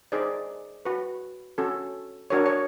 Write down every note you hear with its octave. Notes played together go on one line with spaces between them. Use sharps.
D#4 G#4 C5 D5
F#4 B4
C#4 F#4 A4
D4 F#4 A#4 C#5
C#5